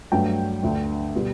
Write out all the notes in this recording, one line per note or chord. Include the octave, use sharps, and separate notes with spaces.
G2 F#3 A3 G5
D2 D3 A3
B2 G3